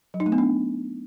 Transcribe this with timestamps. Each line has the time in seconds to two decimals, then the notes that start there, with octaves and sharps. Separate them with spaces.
0.14 F#3
0.20 D#4
0.26 A3
0.32 B3
0.38 D4